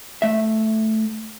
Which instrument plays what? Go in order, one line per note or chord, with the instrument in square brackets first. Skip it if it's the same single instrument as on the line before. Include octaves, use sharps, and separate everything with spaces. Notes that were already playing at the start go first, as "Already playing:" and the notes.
[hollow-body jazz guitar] A3 E5